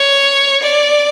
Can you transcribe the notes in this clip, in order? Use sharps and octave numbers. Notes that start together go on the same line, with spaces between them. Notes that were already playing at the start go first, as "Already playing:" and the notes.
Already playing: C#5
D5